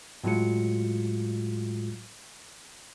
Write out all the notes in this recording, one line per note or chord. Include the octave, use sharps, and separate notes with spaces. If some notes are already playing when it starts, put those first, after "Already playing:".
A2 F#3 G#3 F4 F#4 C#7